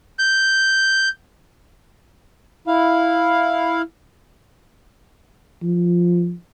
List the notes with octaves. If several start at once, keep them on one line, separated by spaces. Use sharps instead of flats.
G6
E4 F5
F3